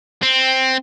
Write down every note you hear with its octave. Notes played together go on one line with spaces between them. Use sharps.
C4